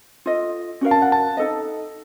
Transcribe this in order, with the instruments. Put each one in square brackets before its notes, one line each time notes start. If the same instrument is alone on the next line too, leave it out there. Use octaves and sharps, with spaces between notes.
[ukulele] F4 A4 D#5
C#4 F#4 A#4 F5
[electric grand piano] A5
F#5
A5
[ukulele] D#4 A4 D#5